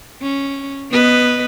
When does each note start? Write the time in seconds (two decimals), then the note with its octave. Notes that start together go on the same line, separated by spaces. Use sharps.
0.22 C#4
0.91 B3 B4 D#5